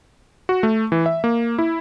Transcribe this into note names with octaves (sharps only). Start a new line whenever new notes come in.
F#4
A3
E3
E5
A#3
E4